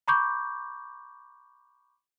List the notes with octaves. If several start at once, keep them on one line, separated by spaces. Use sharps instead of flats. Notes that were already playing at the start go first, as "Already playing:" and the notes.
A#5 B5 C#6 D6 G6